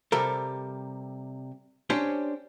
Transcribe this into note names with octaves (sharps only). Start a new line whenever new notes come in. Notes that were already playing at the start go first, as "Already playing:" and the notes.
C3 G3 A4 A#4
C#4 D4 G4 C5